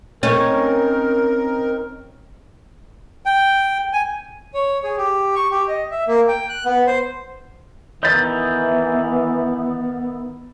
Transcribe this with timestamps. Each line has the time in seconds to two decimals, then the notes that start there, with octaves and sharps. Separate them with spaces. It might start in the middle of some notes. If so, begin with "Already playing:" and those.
0.23 C4 C#4 D#4 A#4
3.26 G5
3.93 G#5
4.54 C#5
4.84 G#4
4.97 G4
5.35 C#6
5.50 G4
5.68 D#5
5.91 E5
6.07 A#3
6.28 G5
6.49 F#6
6.65 B3
6.87 C5
8.03 D#3 E3 B3 D#4 E4 G6 A6